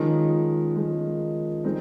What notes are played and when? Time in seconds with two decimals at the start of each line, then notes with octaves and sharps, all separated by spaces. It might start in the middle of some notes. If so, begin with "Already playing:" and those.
Already playing: D#3 F3 G#3 C#4 F4
0.76 F3 G#3 C#4 F4
1.64 G#3 C4 D#4